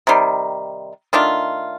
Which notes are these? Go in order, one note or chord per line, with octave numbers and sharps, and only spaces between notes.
C3 D#3 G3
D#3 A3 D4 F4